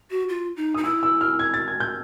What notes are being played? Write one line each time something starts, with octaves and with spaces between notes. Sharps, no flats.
F#4
F4
D#4
D#4 D#6
E4 E6
E6
F6
G#6
A6
G#6
G6